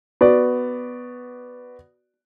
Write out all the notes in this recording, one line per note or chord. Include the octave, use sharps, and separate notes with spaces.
B3 F#4 D5